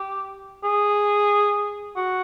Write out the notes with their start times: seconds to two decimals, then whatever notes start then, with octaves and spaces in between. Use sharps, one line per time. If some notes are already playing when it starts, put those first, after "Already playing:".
Already playing: G4
0.64 G#4
1.96 F#4